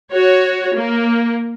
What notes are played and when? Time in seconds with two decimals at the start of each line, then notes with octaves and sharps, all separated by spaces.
0.11 F#4 C#5
0.75 A#3